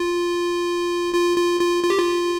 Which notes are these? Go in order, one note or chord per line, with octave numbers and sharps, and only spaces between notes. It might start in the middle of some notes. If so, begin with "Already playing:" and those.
Already playing: F4
F4
F4
F4
F4
G4
F4